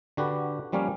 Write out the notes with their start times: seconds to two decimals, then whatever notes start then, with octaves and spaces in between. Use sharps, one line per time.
0.17 D3 F#4 G4 B4
0.72 F3 G3 A#3 C#4 C#5 F5